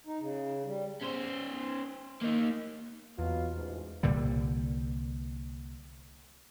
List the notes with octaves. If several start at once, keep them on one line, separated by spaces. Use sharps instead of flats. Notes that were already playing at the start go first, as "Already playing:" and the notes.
D#4
C#3
G3
C#4 C5
A#3 D#4
E2 B2 F#3 F4
A1 G#2
C2 A#2 D3 G3